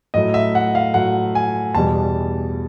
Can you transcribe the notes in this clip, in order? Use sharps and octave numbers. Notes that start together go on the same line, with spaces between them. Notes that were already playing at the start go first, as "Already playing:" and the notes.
A2 F#3 A3 D#5
E5
F#5
F5
A2 F#3 A3 F#5
G#5
E2 B2 G3 A5